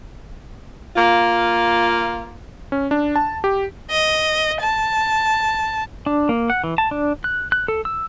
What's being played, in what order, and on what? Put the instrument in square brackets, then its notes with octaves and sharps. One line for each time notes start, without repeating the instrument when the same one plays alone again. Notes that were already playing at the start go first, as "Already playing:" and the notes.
[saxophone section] A#3 F4
[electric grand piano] C#4
D4
A5
G4
[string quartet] D#5
A5
[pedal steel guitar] D4
A#3
F#5
E3
A5
D4
F#6
F#6
A4
E6